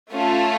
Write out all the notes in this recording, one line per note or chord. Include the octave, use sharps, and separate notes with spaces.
A3 C#4 F4 A4